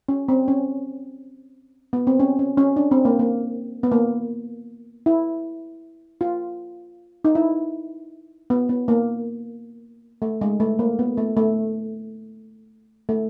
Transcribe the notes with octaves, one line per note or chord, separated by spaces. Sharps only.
C#4
C4
C#4
B3
C4
C#4
C#4
C#4
D4
C4
A#3
A#3
B3
A#3
E4
F4
D#4
E4
B3
B3
A#3
A3
G#3
A3
A#3
B3
A3
A3
A3